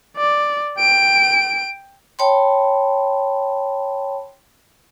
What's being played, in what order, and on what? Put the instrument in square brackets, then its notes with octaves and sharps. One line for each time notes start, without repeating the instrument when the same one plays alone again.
[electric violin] D5
G5 D7
[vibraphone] C#5 G5 A5 B5 C6